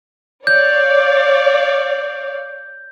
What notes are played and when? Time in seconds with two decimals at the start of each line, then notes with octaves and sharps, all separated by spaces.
0.47 C#5 D5 F5 G6